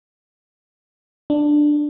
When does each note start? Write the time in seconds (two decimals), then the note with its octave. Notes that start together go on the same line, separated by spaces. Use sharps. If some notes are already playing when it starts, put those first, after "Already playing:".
1.30 D4